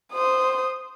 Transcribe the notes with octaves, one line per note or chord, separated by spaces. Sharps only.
C5 D#6